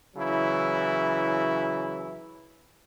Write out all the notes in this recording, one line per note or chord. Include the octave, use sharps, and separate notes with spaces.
C#3 E3 F#3 E4